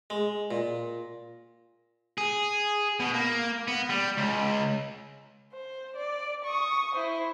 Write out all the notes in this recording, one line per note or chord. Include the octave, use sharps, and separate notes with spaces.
G#3
A#2
G#4
B2
A#3
B3
G3
C#2
C5
D5
C#6 D#6
E4 C5